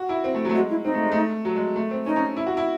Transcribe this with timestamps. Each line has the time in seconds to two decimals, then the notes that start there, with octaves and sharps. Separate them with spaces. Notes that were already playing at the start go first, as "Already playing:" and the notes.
Already playing: F#4
0.09 E4
0.24 C4
0.34 A3
0.45 F#3 A3
0.54 G#3 F#4
0.70 E4
0.84 C4 D#4
0.94 A3
1.03 G#3
1.12 A3
1.45 F#3
1.56 G#3
1.76 A3
1.91 C4
2.06 C#4 D#4
2.16 C#4
2.37 E4
2.46 F#4
2.57 E4